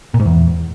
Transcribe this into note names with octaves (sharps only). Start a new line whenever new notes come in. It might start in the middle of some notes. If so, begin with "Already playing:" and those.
A#2
G#2
E2